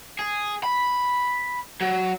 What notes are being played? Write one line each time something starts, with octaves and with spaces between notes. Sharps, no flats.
G#4
B5
F#3